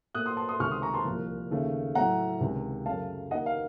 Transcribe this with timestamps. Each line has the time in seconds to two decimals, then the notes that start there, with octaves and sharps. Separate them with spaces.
0.15 A#2 A3 D#6 F#6
0.26 C6 D#6
0.37 A5 C6
0.49 C6 D#6
0.60 C#2 C3 D#3 A3 C#6 F6
0.71 C6 D#6
0.82 A#5 C#6
0.94 A5 C6
1.05 C2 A#2 F3
1.51 D#2 C#3 A3
1.95 A2 F#3 A3 F#5 A#5
2.41 C#2 C3 D#3
2.86 F#2 C#3 F#3 A3 F5 A5
3.31 D#2 D#3 A#3 D#5 F#5
3.46 F5